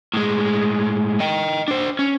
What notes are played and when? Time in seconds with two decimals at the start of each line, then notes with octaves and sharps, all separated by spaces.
0.14 A2 G#3
1.20 D#5 G5
1.68 D4 C5
1.99 C#4